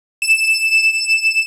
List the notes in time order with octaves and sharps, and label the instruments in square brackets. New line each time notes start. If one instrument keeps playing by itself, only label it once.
[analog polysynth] E7